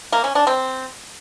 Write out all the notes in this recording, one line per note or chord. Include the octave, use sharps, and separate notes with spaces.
A#3
C#4
D4
C4